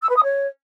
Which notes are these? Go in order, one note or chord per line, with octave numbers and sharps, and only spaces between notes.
E6
B4
D#6
C#5